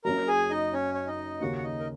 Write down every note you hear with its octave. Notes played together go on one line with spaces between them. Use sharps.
F#1 F#2 F#3 A#4 A#5
G#4 G#5
D#4 D#5
C#4 C#5
C#5
D#4 D#5
D#2 C#3 A#3 F#4 F#5
F#5
D#4 D#5
A#4